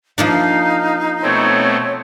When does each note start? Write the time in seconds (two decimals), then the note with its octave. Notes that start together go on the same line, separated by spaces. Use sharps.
0.18 F3 A#3 D4 D#4 F5
1.22 B2 A3 C4 C#5